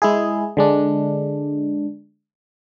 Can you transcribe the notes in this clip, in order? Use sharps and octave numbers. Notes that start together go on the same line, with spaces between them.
G#3 E4 G#4
D3 G#3 D4